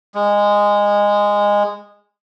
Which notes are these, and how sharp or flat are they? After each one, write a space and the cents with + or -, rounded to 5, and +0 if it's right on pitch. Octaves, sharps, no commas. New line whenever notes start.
G#3 -15